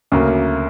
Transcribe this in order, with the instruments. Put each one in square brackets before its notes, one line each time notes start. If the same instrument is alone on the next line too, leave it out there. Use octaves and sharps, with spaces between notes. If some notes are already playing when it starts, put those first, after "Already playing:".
[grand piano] D2 C#3 F#3 A#3